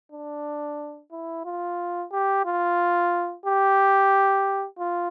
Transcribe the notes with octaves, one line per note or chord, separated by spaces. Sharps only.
D4
E4
F4
G4
F4
G4
F4